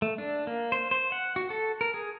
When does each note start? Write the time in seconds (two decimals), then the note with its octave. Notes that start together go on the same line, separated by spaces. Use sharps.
0.02 A3
0.18 D4
0.47 A#3
0.72 C5
0.91 C5
1.12 F#5
1.36 F#4
1.50 A4
1.81 A#4
1.94 G#4